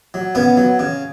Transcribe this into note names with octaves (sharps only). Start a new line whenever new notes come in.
F#3
C#3 B3
F#3
C#3